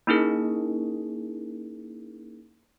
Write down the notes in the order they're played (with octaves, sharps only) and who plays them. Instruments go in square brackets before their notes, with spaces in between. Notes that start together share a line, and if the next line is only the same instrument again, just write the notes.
[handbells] A#3 C#4 D#4 E4 G#4 A#4